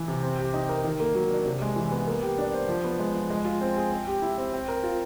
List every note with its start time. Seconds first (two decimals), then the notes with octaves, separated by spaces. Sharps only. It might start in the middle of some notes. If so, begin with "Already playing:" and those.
Already playing: E3
0.08 C3
0.23 C4
0.39 G4
0.54 D#4
0.69 A#4
0.84 D#3
1.00 A#3
1.15 F#3
1.31 D4
1.46 C3
1.62 G#3
1.76 E3
1.92 B3
2.07 A#3
2.23 G4
2.38 D4
2.54 C5
2.69 F3
2.84 B3
2.99 G#3
3.15 F3
3.30 G#3
3.45 F4
3.61 C4
3.77 G#4
3.92 C4
4.07 G4
4.22 E4
4.38 C4
4.53 C4
4.68 A#4
4.83 F4